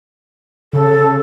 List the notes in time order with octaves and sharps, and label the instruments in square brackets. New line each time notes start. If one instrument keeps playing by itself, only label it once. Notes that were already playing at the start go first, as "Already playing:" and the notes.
[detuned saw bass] C#3 [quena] A4